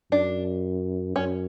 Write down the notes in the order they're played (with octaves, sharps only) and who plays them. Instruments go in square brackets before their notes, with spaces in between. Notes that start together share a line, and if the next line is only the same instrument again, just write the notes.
[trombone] F#2 [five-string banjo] D4
[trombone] F#2 [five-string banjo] C#4